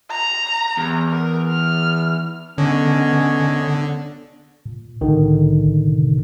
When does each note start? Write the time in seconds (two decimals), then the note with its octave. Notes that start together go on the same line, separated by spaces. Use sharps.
0.11 A#5
0.77 E2
1.10 A#4
1.49 F6
2.58 D3 B3 C#4 C#5 D#5 G#5
4.65 A#2
5.01 C2 A2 D3 D#3
5.87 C3